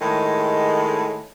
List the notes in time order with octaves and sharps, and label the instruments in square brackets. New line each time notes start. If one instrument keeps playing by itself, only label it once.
[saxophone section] A2 D#3 G#3